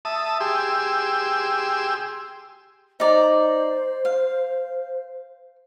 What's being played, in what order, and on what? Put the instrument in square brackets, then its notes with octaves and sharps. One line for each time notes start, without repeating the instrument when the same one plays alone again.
[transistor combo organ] E5 A5 D#6
G4 G#4 C6 E6
[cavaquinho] D#4 D5 A#5 [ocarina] C5
[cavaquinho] F5